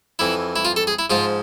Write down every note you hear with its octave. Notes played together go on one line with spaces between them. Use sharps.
F2 E3 E4
E4
F4
A4
G#4
E4
G#2 F3 F4